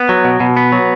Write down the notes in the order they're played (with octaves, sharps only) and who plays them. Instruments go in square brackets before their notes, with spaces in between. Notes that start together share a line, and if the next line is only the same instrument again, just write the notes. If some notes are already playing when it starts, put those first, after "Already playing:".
Already playing: [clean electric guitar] B3
F#3
B2
B2
B3
F#3